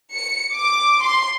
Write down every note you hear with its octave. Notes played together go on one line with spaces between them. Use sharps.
C#7
D6
C6